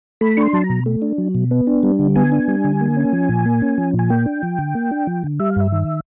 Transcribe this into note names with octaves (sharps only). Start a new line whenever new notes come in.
A3 B5
D4 C#6
C6
F#3 A5
A#5
B2
A3
D4
F#3
B2
B3
D4
G3
D3
B3 G#5
D4
G3
D3
A#3
C#4
F3
A#2
A#3
C#4
F3
A#2
G#5
A#3 G5
D4
F3
D3
A#3
D4
F3
D3
G3 E5
F5
G2 E5
D#3